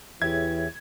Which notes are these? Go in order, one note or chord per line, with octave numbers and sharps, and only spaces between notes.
E2 E3 G4 G#4 C#5 E5 G#6